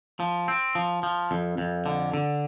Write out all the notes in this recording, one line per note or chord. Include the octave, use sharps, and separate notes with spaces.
F3
C4
F3
F3
F2
F2
D3
D3